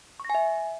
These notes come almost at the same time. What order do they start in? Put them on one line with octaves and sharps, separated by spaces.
C#6 A#6 G#5 E5